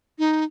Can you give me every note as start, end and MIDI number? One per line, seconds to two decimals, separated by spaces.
0.19 0.44 63